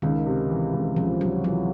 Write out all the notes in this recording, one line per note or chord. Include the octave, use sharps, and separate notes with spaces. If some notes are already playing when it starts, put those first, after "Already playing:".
C#2 D#3
C3
E3
C#2
C#2 F3
C3 F#3
E3 F#3